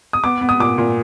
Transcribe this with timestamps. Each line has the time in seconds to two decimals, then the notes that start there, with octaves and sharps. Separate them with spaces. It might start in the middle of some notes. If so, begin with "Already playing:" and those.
0.13 D#6
0.24 B3 D6
0.41 B3
0.49 D#6
0.60 A#2 D6
0.78 A#2